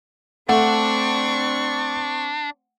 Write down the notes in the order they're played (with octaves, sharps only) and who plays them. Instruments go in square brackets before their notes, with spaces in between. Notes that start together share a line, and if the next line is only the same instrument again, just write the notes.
[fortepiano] A3 [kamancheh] C4 C#6 [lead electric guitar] D4 [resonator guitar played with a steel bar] F#5